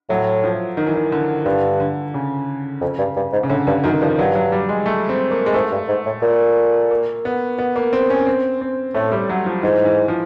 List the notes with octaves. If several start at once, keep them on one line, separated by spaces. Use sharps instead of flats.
A2 F#3
F3
D#3
E3
D#3
D3
G2 D3
D3
C#3
F2
G2
G2
G#2
C#3
A2 D3
G2 D3
F#2 D#3
G2 F3
G2 F#3
F#3
G3
G#3
A3
C4
A#3
G#3
G#2 A3
G2
G#2
A2
A#2
A#3
B3
B3
A#3
C4
C#4
C4
C4
A2 A3
G3
F#3
F3
G#2 E3
E3
F3